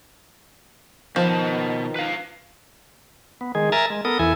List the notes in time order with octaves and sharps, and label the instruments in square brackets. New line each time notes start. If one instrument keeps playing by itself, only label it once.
[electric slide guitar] B2 A5 [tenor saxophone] D#3 [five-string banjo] F3
[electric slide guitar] B4 F5
[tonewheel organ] B3
D#3 G#3 G#4
A#4 E5 G#5 A#5 A6
G#3
B3 A4 A#4 D#6
E2 E3 E4 A4 G#5